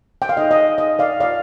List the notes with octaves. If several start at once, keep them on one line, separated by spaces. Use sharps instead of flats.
G5
F5
D#4 A4 C5 D#5
D#5
D#5
D5 F5
F4 A#4 D5 F5